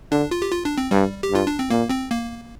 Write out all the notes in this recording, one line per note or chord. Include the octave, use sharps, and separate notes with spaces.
D3 D4
F4
G4
F4
D4
C4
G2 G3
G4
G2 F4
D4
C4
A#2 A#3
C4
A#3